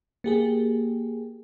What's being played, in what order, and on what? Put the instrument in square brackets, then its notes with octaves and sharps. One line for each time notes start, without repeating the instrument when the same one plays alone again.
[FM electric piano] A#3 G4 G#4